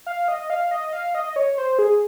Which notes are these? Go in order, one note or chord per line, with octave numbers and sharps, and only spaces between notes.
F5
D#5
F5
D#5
F5
D#5
C#5
C5
G#4